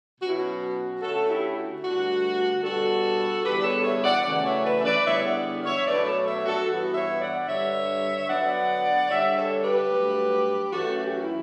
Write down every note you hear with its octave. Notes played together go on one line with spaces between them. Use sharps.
B2 F#3 C#4 F#4
E4
F#4
D3 A3 C#4 F#4 A4
E4 G4
F#4
G2 D3 A3 D4 F#4
B2 G3 D4 F#4 A4
E2 D3 G3 B3 G4 B4
D5
A4 C#5
C#5 E5
D5 F#5
F#2 C#3 E3 A3 C#4 D5 F#5
C#5 E5
B4 D5
E5
B4 D5
E2 D3 G3 B3 C#5 E5
E5
D5 F#5
C#5 E5
B2 F#3 A3 D4 B4 D5
A4 C#5
C#5 E5
F#4 A4
G2 E3 B3 F#4
C#5 E5
D5 F#5
G2 D3 G3 C#5 E5
D3 F#3 B3 D4 D5 F#5
D3 G3 D4 C#5 E5
A4 C#5
G4 B4
G2 F#3 A3
F#2 E3 A3 C#4 F#4 A4
F#4
G4
F#4
E4